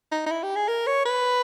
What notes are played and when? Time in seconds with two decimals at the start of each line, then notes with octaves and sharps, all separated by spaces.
0.12 D#4
0.26 D#4
0.31 E4
0.43 G4
0.56 G#4
0.68 A#4
0.87 C#5
1.05 B4